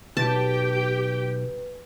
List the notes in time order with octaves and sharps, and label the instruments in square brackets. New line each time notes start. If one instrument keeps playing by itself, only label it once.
[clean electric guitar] B1 [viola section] G4 G5 [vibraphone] B4 [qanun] A5